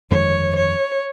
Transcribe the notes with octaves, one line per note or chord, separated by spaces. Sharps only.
G1 F2 D#3 G#3 C#5
C#5